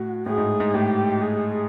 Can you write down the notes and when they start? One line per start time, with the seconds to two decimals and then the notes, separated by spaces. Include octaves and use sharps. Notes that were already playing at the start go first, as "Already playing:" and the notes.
Already playing: A2 F#4
0.26 A2 G#4
0.37 G#2
0.60 G#2
0.74 A2 G4
1.21 G#4